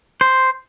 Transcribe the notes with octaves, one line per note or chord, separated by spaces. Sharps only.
C5